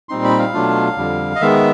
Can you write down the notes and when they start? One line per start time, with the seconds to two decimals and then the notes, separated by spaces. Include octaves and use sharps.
0.09 A#2 G3 C4 D#4 C6
0.24 B5
0.39 F5
0.54 B2 F#3 A3 D4 F4
0.97 F2 D3 G3
1.36 D#5
1.41 D#3 G#3 B3 E5